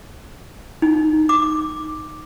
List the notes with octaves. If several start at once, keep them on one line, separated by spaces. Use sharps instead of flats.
D#4
D6